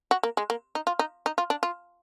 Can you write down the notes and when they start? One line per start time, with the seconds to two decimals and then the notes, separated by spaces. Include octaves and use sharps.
0.11 F#4
0.23 A#3
0.37 G#3
0.50 A#3
0.75 D#4
0.87 F4
0.99 D#4
1.26 D#4
1.38 F4
1.50 D4
1.63 F4